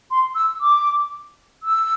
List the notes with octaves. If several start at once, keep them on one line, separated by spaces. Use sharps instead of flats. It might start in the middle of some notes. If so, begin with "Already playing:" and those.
C6
E6
D6
E6